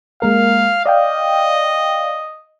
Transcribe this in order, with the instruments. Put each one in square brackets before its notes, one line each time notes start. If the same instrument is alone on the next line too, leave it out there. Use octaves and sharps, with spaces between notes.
[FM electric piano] G#3 A#3 A#4 [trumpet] F5
[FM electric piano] D5 F5 G5 [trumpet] D#5